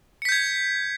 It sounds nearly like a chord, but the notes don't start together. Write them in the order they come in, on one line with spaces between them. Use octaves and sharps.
C#7 B6 G6 G#6